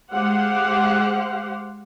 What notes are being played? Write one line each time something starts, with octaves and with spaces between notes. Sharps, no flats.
G#3 G4 C5 F5 F#5